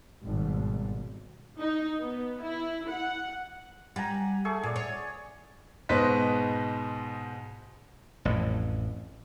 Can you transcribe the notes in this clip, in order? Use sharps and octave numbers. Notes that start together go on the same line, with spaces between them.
G#1 B2 G3
D#4
B3
E4
F#5
G3 F#5 G#5 A#5
A3 G#4 C#6
A#2 D5 G#5
C#5
G#2 B2 B4 C5 D#5 B6
A1 F2 A2